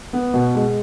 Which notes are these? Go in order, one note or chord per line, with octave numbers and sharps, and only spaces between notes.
B3
B2
G#3